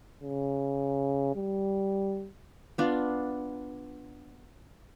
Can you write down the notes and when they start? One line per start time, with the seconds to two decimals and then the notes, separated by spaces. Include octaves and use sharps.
0.23 C#3
1.35 G3
2.78 B3 D4 F4